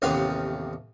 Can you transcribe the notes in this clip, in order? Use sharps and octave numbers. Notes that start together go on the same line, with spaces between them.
A1 D#2 C3 B3 F5